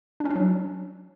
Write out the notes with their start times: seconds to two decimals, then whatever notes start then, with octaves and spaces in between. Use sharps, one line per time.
0.20 D4
0.25 C#4
0.30 D4
0.36 F#3